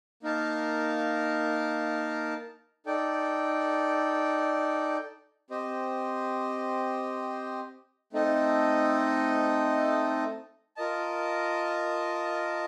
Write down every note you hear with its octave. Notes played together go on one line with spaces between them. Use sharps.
A#3 D#4 A#4 F5 A5
D#4 A4 D5 G5
C4 G4 C5 D#5
A3 C4 D#4 A4 D#5
F4 A#4 D#5 A5